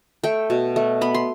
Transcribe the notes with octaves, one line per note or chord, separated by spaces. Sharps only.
A3 G5
B2
A3
B3 B5
C6